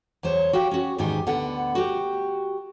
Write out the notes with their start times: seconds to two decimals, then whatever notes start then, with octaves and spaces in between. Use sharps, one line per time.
0.23 E2 F#3 C5 C#5
0.53 F#4 G4 F5 G5
0.71 C#4 F#4
0.98 E2 G#2 D#3 D#4 G4 G#5
1.26 D2 D3 B3 F#5
1.75 F#4 G4